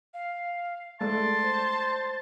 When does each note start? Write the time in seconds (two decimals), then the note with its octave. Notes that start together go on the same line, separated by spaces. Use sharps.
0.14 F5
1.01 G#3 A3 D5 A5 C6
1.42 C5